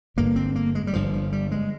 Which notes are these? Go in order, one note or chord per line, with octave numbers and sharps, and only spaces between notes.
G1 G2 D3 A#3
C4
A#3
G#3
G3
G1 G2 D3 F3
F3
G3
G#3